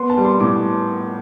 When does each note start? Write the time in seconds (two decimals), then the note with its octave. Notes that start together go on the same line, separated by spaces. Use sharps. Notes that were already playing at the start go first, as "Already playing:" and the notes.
Already playing: B3 C6
0.10 A5
0.17 G3
0.25 C6
0.40 A2 D6